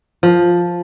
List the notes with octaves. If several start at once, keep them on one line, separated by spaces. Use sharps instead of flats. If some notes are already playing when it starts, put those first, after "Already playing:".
F3